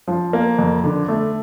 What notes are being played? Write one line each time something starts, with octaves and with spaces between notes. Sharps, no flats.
F3
A#3
F2
D3
A3